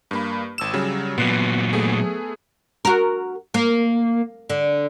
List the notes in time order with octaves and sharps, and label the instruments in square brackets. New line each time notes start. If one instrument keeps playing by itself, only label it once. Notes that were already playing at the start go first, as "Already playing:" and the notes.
[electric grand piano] G2 A#3 B5
G#1 E6 E7
C#3 F#3 G3
[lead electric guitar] A#2 F#3 [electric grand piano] B3 F#6
[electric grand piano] A3 B3 G#4
[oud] F#4 A#4
A#3
D3